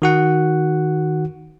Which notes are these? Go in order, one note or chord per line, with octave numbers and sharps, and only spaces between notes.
D#3 F#4 F#5